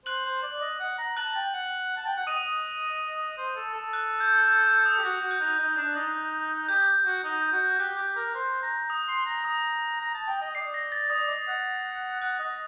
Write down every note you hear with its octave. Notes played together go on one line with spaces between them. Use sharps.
C5 F#6 F#7
C5
D5
D#5
F#5
A#5
A5 F#6 F#7
G5
F#5
A5
G5
F#5
D#5 D#6 D#7
C5
A4
A4
F#6
G6
G6
G6
D#6
G4
F#4 D#6
F#4
F#6
D#4
D#4
D4
D#4
G4 G6
F#4
D#4
F#4
G4 F#6
G4
A#4
C5
A#5
D#6
C6
A#5
D#6
A#5
A5
G5
D#5
D5 C7
A#6
A6
D5 D#6
D#5
F#5
F#5 F#6
D#5